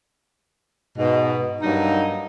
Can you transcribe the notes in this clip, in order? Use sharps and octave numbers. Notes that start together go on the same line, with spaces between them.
G#2 B2
G2 F#3 A#3 D#4